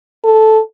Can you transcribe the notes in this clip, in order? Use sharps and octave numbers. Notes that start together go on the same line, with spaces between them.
A4